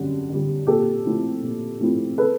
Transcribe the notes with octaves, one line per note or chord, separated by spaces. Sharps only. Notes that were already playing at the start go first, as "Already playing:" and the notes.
Already playing: F#2 D3 G3
D3 G3
A#2 G4 A4
F3 A3 C4 E4
A#2
F3 A3 C4 E4
A4 B4